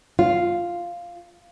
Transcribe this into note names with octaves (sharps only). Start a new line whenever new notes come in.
F4